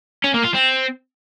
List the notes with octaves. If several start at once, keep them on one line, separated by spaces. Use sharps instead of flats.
C#4
A#3
F4
C4